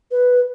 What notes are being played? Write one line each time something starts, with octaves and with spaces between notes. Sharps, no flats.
B4